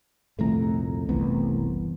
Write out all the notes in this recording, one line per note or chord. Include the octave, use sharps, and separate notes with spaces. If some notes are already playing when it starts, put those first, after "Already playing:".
D#1 C2 F2 A3 A#5
F#1 C2 E3 B3